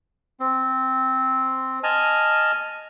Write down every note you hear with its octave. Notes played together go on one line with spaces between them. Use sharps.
C4
D#5 G#5 A5 F6